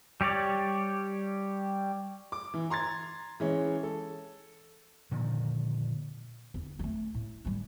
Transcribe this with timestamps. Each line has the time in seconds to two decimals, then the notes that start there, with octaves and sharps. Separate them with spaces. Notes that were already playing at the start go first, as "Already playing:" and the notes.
0.21 G3 G4 C#5 D5
2.32 D6
2.54 E3
2.70 A#5 C6 G#6 A6
3.40 E3 G#3 C#4
3.83 A4
5.11 A#2 D3 D#3 F3
6.54 E2 D3
6.79 G#3 A3
7.14 A2
7.45 G3 A3